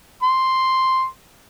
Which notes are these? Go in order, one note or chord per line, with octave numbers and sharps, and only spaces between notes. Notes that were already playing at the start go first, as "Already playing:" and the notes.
C6